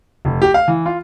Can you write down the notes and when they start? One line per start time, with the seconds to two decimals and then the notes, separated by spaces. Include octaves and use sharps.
0.25 F1
0.42 G4
0.54 F5
0.68 E3
0.86 F4